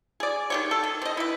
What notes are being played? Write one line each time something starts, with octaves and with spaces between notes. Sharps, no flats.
G#4 D5
D#3 G4 C#5
A4
D#3
C4 D#5
E4 B4